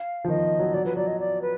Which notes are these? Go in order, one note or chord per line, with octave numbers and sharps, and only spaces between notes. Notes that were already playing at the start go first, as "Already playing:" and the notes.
Already playing: F5
F3
D#3 D#5
F#3
F#3 D5
F3 B4
F#3 D5
D#5
D5
B4